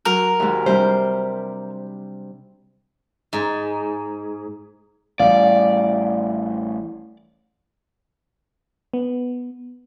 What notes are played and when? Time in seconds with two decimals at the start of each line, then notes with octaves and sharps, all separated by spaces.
0.05 F#3 A#4
0.40 D#2 G#2
0.66 C3 G3 D4 C5
3.33 G#2
5.20 A1 G3 D5 F5
8.94 B3